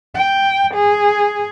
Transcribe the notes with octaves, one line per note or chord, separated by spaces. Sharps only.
G5
G#4